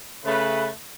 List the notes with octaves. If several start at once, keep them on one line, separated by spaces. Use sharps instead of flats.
C#3 A3 B4